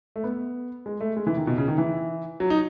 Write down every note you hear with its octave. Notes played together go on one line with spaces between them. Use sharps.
A3
B3
G#3
A3
G#3
E3
D#3
B2
C#3
D#3
E3
F#3
D#4